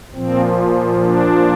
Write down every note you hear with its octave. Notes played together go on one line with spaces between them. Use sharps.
A#2 F3 C4
D4